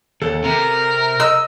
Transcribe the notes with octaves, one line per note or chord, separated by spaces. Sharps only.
D#2 A4
C3 A#4
D#5 E6